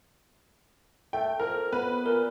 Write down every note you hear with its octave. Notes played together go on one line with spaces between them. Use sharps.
A3 G5
F2 A#4
B3 B4
A#2 A#4